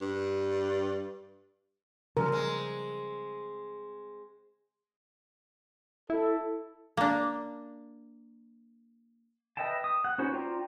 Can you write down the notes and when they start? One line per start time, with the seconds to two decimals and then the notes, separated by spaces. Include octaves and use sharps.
0.01 G2
2.17 F#2 C#3 F3 G3 A#4
2.32 G#3 C4
6.10 E4 A4
6.97 A#3 D4
9.57 B4 D#5 E5 G5 A5
9.84 D#6
10.04 F#5
10.18 C#4 D#4 F#4 B4 C5
10.33 D4 F4 G5 A#5